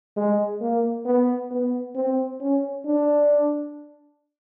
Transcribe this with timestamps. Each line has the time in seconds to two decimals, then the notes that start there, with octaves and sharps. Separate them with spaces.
0.17 G#3
0.61 A#3
1.06 B3
1.51 B3
1.95 C4
2.41 C#4
2.86 D4